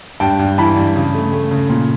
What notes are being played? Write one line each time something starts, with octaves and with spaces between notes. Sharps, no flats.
G2 G5 A5
G2
E3 A5 B5
G2
C#3
A3
A3
C#3
A#2